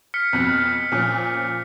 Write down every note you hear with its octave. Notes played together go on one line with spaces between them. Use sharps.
F6 B6 C#7
F2 B2 F#6
A#2 F3 C#4